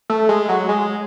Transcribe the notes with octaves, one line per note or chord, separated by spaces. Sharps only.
A3
G#3
F#3
G#3